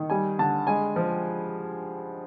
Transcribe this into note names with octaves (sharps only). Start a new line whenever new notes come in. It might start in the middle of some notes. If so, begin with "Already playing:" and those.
Already playing: D#3
G3 G#5
D3 A5
G#3 G#5
F3